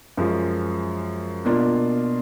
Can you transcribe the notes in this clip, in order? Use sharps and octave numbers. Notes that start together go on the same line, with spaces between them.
F#2 F3 G#3
B2 A#3 D4 F4